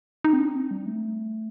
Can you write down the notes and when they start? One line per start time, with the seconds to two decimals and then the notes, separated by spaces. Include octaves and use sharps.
0.24 D#4
0.33 C4
0.40 D4
0.56 C4
0.71 G3
0.86 A3